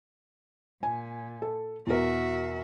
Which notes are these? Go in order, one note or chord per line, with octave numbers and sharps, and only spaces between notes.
A#2 G#5
A4
E2 B2 F#4 A#4 E5